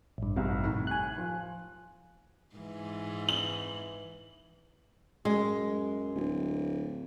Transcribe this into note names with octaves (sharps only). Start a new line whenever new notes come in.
A1 G2
F1 C2 C3
D#2 A2
G#5 F#6
F3
G#2 E3
F#7
F#2 G#3
D1